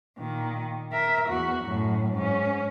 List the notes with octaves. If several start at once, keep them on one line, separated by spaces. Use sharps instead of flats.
A#2 D#3
A#4 E5
E2 F#4
F#2 A2
G#2 C#4